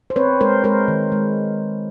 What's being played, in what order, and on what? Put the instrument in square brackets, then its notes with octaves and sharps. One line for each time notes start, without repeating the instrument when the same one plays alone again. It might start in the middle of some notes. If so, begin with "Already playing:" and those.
[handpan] C5
C4 B4 C#5
G#3 A#4 C5
G#3 A#4 C5
D#3
G#3